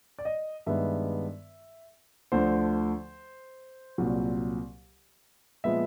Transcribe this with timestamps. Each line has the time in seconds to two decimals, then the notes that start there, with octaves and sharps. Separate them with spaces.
0.19 D5
0.25 D#5
0.66 G2 D#3 G#3 B3 E5
2.32 D2 D3 F3 A3 C5
3.98 C2 A#2 F#3
5.64 A#2 F3 G#3 B3 E5